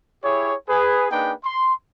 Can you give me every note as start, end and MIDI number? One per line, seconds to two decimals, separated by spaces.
0.24 0.54 64
0.24 0.54 67
0.24 0.54 68
0.24 0.54 73
0.69 1.06 68
0.69 1.06 71
1.11 1.33 58
1.11 1.33 62
1.11 1.33 63
1.11 1.33 68
1.11 1.33 71
1.11 1.33 79
1.44 1.73 84